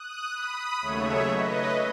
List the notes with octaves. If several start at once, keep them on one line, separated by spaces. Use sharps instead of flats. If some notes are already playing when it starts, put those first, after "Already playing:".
Already playing: D#6 F#6
B5 D#6
D#2 C#3 F#3 A3 C#5 E5
B4 D#5